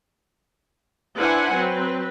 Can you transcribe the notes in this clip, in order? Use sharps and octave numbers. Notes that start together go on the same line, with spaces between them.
D4 E4 B4 C5 F#5 G#5
F#3 C4 B4